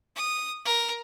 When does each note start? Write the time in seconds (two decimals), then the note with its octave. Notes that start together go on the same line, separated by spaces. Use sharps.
0.16 D#6
0.65 A#4